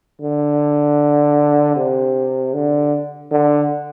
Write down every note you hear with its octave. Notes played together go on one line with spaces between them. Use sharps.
D3
C3
D3
D3